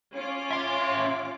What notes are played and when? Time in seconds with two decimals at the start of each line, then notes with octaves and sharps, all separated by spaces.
0.15 C#4 F4 D6
0.51 E5 C6